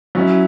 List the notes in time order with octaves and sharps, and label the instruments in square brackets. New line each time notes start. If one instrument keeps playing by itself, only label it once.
[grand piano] F#3 C#4 E4